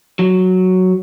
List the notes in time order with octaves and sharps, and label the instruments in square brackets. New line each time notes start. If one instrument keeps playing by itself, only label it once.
[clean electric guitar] F#3